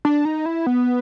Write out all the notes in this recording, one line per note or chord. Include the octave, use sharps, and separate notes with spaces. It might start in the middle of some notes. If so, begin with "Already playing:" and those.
D4
D#4
E4
B3